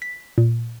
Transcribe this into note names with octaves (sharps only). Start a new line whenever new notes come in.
B6
A#2